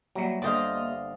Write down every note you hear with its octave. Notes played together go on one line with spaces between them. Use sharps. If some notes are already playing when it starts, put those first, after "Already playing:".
F#3 G3 A#3 G4 E5
G1 D3 C5 D5 D#5 F5